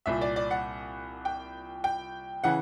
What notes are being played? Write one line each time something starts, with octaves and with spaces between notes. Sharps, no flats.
C2 A#2 E5
D5
D5
F#5
G5
G5
C#3 E3 F#5